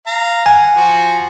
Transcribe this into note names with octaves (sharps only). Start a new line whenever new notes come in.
F5 A#5
F#5 G#5
F3 F#4